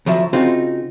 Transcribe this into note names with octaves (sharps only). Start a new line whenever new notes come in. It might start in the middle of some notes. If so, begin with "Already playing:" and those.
D2 F3 F#3 E5
C#3 C4 D#4 F4 F#4